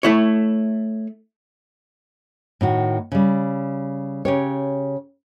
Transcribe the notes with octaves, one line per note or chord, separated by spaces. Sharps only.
A3 E4 C#5
A2 D#3 F#4
C#3 G3
C#3 G4 C#5